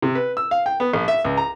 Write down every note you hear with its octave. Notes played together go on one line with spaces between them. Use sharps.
C3
B4
E6
F5
G5
B3
A#1
E5
C#2
A#5